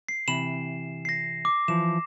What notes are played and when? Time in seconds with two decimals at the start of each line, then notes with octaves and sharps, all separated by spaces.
0.09 C7
0.28 C3 E3 B5 E7
1.05 A#6 C7
1.45 D6
1.68 E3 F3 E7